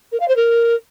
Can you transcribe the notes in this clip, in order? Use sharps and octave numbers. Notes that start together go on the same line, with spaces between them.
A#4
F5
C5
A#4